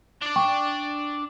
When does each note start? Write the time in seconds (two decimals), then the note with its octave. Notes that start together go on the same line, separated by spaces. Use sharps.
0.22 D4 D5
0.36 G5 C#6